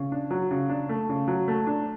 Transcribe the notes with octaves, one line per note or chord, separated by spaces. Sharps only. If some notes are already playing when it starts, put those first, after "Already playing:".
Already playing: C#3
D4
F#3
C#3
D4
A3
C#3
F#3
A3
D4